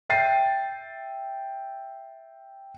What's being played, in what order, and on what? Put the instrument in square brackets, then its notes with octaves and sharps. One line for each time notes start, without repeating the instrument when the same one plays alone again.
[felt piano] E5 G5 A6 C7 D#7